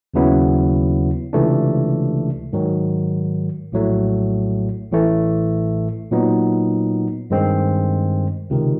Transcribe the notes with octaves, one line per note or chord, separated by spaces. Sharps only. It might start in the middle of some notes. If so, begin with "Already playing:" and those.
D#2 C#3 F#3 B3 E4
C#2 C3 E3 A3 D4
G#2 D#3 F#3
A#1 A2 F#3 A3
A1 A2 E3 A3
A#2 F#3 B3 D#4
G2 D#3 G#3 C4
C#2 C3 D#3